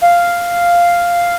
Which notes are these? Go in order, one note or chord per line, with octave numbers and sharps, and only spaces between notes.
F5